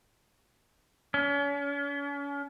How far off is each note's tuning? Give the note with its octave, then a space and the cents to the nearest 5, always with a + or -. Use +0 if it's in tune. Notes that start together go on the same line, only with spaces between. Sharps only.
C#4 +40